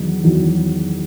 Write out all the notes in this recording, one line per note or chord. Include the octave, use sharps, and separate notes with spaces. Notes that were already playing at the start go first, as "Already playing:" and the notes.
Already playing: E2 D#3 F#3
E2 D#3 F#3